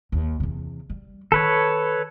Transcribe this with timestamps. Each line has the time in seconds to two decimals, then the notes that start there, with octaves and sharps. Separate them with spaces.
0.12 D#2
0.40 E2 C3
0.90 G3
1.32 D#3 A4 B4 C#5